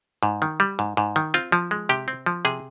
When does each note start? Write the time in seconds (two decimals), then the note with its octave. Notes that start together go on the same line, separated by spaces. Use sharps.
0.23 G#2
0.42 D#3
0.60 G3
0.79 G#2
0.97 G#2
1.16 D#3
1.34 C4 F4
1.52 F3
1.71 G#3
1.89 C3 G4
2.08 C4
2.26 F3
2.45 C3 G#4